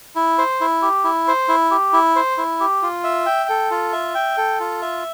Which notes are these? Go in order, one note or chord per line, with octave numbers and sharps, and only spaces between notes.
E4
C5
E4
G4
E4
C5
E4
G4
E4
C5
E4
G4
F4
E5
G5
A4
F4
E5
G5
A4
F4
E5